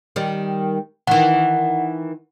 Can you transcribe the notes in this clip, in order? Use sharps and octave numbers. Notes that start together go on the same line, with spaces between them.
D#3 G3
D#3 E3 F#5